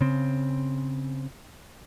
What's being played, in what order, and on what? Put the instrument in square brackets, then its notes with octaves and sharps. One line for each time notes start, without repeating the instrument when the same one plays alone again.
[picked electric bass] C#3 C4